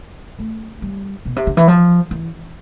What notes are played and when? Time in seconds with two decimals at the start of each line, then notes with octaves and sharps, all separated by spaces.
0.39 A3
0.82 G3
1.25 B2
1.36 C3
1.47 D3
1.57 E3
1.68 F3
2.11 E3